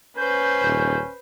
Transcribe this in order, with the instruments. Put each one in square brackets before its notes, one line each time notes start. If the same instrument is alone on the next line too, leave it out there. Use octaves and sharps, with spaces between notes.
[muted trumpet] C#4 [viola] B4 C5 [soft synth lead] G6
[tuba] D#1